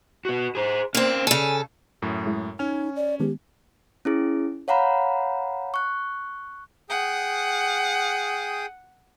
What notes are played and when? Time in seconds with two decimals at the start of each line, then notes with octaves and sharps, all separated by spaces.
0.25 B3 F#4
0.55 G#4 C5
0.95 A#3 C4 C#4 C5
1.27 C#3 A4 G#5
2.02 F#2 A2
2.26 G#3 E4
2.59 C#4 D#4 G#5 F6
2.96 D5
3.20 D#3 G#3 B3 G4
4.05 C#4 E4 G#4
4.68 C#5 F5 F#5 A#5 B5
5.74 C#6 F#6
6.90 G#4 F#5 G5 D#6